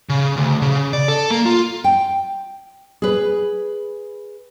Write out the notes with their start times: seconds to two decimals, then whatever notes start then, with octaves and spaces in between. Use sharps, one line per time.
0.09 C#3
0.37 D2
0.62 C#3
0.93 D5
1.08 A4
1.30 A#3
1.46 F4
1.84 G5
3.02 G#4 B4